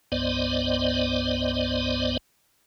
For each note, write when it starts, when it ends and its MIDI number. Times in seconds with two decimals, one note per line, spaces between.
0.12 2.17 36
0.12 2.17 43
0.12 2.17 59
0.12 2.17 72
0.12 2.17 74
0.12 2.17 75